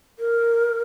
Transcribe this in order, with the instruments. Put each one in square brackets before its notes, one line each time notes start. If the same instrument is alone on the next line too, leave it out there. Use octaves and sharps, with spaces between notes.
[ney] A#4